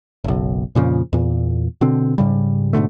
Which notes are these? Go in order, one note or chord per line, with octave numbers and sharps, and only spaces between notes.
F#1 B1
F2 A#2 C#3 F3
E2 A#2
B2 D3 C4
G#2 C#3 G3
G#2 B2 D3 A3